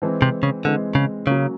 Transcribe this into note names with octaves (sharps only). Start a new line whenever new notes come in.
E3 G#3 C4
C3
C#3
D3 E3 G#3 C4
C#3
C#3 F#3 A#3 C#4